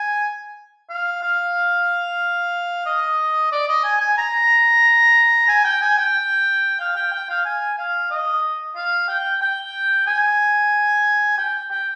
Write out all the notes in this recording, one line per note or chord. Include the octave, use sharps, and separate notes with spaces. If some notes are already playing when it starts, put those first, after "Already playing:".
Already playing: G#5
F5
F5
D#5
D5
D#5
G#5
G#5
A#5
G#5
G5
G#5
G5
F5
G5
G5
F5
G#5
F5
D#5
F5
G5
G5
G#5
G5
G5